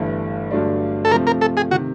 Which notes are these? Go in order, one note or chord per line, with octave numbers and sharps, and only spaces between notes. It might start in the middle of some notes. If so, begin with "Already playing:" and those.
Already playing: G1 G2 E3 A3
G2 D3 F#3 A3 D4
A4
C3 F3 A3 C4 A#4
A#4
A4
G#4
C3 D#3 F#4